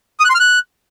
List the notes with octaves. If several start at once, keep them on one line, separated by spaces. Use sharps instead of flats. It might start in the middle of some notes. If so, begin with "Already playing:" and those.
D#6
F#6
C6
F6
F#6